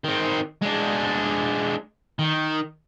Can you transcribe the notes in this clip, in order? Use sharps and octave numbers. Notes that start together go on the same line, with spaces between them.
D#3 C4
G#3 D4
D#3